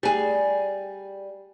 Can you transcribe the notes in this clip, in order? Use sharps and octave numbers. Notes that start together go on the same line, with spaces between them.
G3 G#4